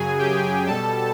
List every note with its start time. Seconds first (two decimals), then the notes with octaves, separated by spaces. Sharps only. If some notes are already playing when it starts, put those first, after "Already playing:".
Already playing: F#2 C#3 F#3 G#4 G#5
0.18 G4 G5
0.66 B2 G3 A4 A5